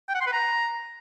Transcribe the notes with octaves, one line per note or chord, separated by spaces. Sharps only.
G5
F#5
C6
B4
A#5